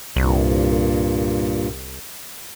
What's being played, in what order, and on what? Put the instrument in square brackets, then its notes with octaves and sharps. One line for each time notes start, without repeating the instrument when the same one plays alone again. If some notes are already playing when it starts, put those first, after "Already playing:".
[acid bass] C2 [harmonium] G2 A#2